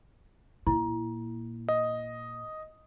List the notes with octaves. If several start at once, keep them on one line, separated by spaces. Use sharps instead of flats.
A#2 E4
D#5